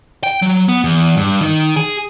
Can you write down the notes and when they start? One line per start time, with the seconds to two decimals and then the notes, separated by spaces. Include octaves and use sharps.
0.23 G5
0.42 F#3
0.68 B3
0.84 E2
1.17 G2
1.41 D#3
1.76 G#4